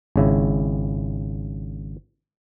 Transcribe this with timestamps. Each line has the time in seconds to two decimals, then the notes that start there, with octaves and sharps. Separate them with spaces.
0.16 G#1 C#3 E4